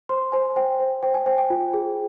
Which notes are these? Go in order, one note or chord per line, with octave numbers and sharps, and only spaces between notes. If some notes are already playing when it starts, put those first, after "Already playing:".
C5 C6
C5 G#5
C5 G5
C5
C5 G5
G#5
C5 G5
G5
F4
G#4